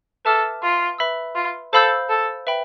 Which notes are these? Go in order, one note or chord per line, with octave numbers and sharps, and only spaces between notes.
A4 B4 E5 A5 D6 F6
F4
B4 E5 B5 E6
F4
A4 C5 F5 B5 E6 G6
A4
B4 E5 G5 B5